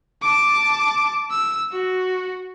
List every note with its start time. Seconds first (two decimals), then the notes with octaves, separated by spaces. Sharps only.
0.22 A5 D6
1.30 E6
1.72 F#4